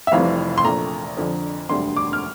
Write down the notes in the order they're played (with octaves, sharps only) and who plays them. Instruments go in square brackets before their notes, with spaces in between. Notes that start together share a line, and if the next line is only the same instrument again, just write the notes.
[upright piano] E5
F1 F2 C3 E3 G3 F5
C6
A#1 A#2 A3 A#5
F2 D3 F3
E1 D2 D3 G3 C6
D6
F6